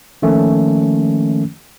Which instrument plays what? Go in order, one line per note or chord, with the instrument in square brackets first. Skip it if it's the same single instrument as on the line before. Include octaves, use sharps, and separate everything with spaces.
[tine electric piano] D#3 F3 A3 A#3 C#4